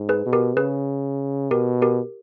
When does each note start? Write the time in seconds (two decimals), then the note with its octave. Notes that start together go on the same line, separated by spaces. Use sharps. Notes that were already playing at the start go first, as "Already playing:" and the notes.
Already playing: G#2
0.09 G#4 B4
0.26 B2
0.33 G4 A#4
0.56 C#3 G#4 B4
1.50 B2 G4 A#4
1.82 G4 A#4